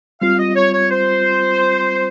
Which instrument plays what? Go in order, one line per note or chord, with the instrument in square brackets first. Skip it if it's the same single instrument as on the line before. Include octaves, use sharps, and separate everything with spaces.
[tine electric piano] G3 C4 F4 [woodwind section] F5
[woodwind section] D#5
C#5
C#5
C5